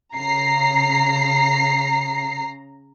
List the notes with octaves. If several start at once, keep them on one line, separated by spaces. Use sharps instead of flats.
C#3 A#5 C7